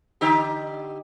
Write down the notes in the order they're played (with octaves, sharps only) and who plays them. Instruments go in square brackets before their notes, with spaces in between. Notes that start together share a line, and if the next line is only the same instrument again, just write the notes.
[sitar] D3 D#4 G4